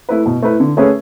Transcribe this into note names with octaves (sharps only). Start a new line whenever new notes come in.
A3 E4 B4
B2
A3 E4 B4
D3
A3 C#4 G#4 B4